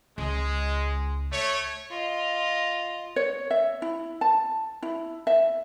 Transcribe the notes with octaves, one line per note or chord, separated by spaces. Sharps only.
C#2 G#3
A3 C#5
F4 D#5
C#5
E5
E4
A5
E4
E5